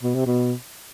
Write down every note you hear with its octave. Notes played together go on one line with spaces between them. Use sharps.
B2
C3
B2